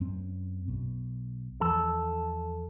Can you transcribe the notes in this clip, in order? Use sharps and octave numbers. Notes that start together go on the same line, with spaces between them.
F#2 C4 C#4
B1 B2
E2 E3 F3 A4